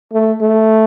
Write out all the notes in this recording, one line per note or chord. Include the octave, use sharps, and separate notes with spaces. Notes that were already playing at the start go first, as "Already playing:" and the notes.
A3
A3